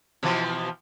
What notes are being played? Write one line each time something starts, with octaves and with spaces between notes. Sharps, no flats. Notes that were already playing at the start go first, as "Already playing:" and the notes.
B2 E3 F3